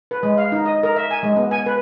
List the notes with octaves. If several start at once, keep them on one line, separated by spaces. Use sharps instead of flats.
B4
G#3
F5
D#4
D#5
A#4
E5
G#5
G#3
B3
G#5
B4